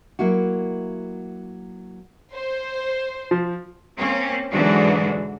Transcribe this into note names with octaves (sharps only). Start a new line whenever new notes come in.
F#3 A#3 E4 F#4
C5
F3
A#3 C4 C#4
G#2 D3 E3 F#3 D4 F#4